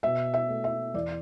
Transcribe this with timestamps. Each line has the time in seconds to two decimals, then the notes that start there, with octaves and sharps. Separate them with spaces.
0.03 B2 E5
0.34 E5
0.49 A3
0.64 E5
0.94 E2 D5